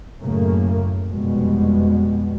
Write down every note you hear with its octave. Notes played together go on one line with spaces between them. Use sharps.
F#2 A2 C#3 A3 A#3
F1 F2 B2 G3 G#3